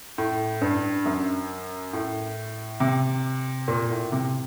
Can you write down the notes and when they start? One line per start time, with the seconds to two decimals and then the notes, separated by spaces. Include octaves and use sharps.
0.18 A2
0.61 G2
1.06 F#2
1.93 A2
2.80 C3
3.68 A#2
3.90 A2
4.12 C3